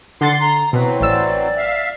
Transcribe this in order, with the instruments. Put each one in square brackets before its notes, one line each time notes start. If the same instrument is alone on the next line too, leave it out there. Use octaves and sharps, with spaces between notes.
[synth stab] D3 A6 [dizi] F#5 [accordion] C6
[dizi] A#5
[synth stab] B2 [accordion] E3 F#3 C4 [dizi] B4
[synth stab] A1 E6 [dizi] D5
[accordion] E5 F5